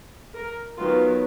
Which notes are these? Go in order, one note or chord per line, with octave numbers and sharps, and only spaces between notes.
A#4
D#3 F#3 B3 F4